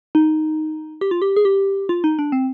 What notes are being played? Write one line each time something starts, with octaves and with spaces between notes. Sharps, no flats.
D#4
G4
F4
G4
G#4
G4
F4
D#4
D4
C4